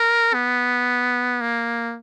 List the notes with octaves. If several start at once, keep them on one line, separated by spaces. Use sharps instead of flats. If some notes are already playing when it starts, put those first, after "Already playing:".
Already playing: A#4
B3
A#3